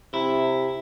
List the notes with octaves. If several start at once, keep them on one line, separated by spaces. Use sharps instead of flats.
C3 E4